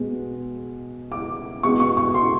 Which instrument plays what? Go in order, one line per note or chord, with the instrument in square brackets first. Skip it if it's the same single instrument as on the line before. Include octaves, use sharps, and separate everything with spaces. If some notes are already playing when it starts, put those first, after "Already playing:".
Already playing: [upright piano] B2 G#3 B3
D6
B2 G#3 B3 C#6
C#6
C#6
C6